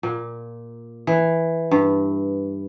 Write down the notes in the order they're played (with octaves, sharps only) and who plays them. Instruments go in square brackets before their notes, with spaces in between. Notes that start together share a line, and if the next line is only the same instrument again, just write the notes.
[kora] A#2
E3
G2